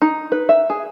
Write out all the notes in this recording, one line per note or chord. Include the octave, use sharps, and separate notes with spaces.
D#4
B4
E5
G#4